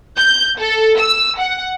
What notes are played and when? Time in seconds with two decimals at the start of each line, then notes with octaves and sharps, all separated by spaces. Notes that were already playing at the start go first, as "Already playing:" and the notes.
0.17 G6
0.59 A4
0.98 E6
1.39 F#5